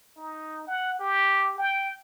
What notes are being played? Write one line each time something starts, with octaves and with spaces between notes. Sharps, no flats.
D#4
F#5
G4
G5